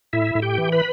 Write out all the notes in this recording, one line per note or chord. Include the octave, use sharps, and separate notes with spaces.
A2 E4 E5
A2
G4 G5
E3
B4 B5